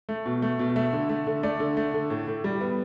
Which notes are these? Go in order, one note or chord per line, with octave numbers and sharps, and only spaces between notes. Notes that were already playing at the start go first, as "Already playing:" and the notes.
A3
B2
A3
B2
A3 E5
D3
A3
D3
A3 D5
D3
A3
D3
A2
A2
G3
B3